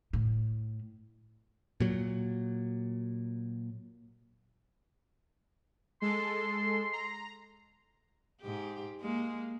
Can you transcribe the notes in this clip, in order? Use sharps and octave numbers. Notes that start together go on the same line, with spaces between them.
A2
A#2 F#3
G#3 A4 C6
A#5
G#2 G4
G#3 A#3